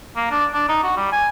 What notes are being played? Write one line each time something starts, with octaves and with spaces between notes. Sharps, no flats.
A#3
D4
D4
D#4
F#4
G3
G#5